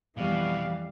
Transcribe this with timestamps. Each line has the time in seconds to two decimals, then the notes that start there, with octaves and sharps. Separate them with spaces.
0.17 F2 B2 E3 G3 F5